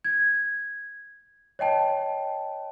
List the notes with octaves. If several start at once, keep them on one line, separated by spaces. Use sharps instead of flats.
G#6
C#5 D#5 G5 A5